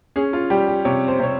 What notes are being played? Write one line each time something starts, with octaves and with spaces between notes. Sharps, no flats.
C#4 G#4
F4
G3 G4
G4
C3 C#5
C5
C3 C#5